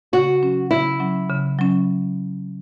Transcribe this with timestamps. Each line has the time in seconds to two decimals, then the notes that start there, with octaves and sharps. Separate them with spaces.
0.13 C#3 F#4
0.43 F#3 C#4
0.71 C#3 E4
1.00 F#3 C#4
1.29 C#3
1.59 F#3 C#4